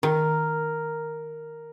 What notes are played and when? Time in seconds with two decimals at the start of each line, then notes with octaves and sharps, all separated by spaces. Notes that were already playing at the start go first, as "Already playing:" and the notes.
0.03 D#3 A#4